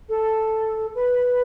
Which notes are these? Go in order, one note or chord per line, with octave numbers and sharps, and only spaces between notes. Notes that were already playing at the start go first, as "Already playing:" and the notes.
A4
B4